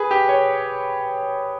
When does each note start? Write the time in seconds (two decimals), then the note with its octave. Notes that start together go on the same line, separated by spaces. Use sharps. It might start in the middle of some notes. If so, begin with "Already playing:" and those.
Already playing: G#4 B4
0.11 G4
0.29 C#5